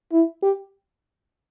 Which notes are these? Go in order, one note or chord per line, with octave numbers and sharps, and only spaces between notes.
E4
G4